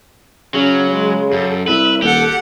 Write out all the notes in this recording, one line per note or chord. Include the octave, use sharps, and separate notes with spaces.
C#3 F#3 C#4
G#3
F#2 A4
C2 B4 E5
D#1 G4 A4 F#5